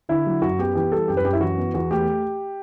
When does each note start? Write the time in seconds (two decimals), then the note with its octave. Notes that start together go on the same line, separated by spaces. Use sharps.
0.09 D3 E4
0.26 F#3
0.42 F#2 F#4
0.59 B3 G4
0.75 E3 G4
0.92 G3 A4
1.08 F#2 G4
1.17 B4
1.25 F#2 G4
1.33 E4
1.41 E3 F#4
1.58 B3
1.74 E2 F#4
1.90 A3 G4